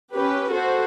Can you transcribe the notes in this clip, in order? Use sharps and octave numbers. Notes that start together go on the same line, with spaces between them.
C#4 G4 B4
F#4 A4 C5